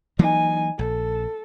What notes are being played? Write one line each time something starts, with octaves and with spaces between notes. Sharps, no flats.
E3 F#3 A#3 D#4 G#5
A#1 A4